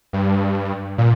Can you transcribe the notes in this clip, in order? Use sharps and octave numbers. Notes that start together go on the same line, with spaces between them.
G2
A#2